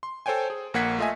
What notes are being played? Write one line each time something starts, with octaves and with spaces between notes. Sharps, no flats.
C6
A4 C5 C#5 G5 G#5
G#4
A#1 A#3 F#5 G#6 B6 C#7
A3 F4 D#5 E5 G#5